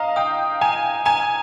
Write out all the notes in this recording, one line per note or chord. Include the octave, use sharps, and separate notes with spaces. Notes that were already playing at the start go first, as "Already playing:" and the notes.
Already playing: D#5 F5 A#5
G5 D#6
G#5 A#5
G#5 A#5